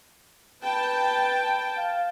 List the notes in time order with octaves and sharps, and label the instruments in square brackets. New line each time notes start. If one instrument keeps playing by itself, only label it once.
[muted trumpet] B4 [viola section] G5 A5
[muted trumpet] F5